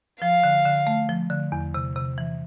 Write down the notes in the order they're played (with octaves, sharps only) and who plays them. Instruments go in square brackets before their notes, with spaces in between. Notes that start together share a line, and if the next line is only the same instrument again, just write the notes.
[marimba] F3 [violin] F5
[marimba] D3
D3
A3
F3
D3
E2
C3
C3
E3